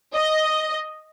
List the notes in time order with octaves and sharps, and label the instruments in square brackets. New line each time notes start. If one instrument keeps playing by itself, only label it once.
[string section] D#5